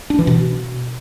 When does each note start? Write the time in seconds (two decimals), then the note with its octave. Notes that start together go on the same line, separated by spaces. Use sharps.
0.10 D4
0.19 E3
0.27 B2